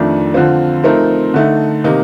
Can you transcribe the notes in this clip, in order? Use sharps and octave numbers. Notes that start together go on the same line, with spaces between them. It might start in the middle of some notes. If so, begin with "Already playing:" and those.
Already playing: F2 D#3 A3 D4
D3 F3 C4 F4
F3 A3 C4 D#4 A#4
D3 A3 D#4
C3 D#3 A#3 D#4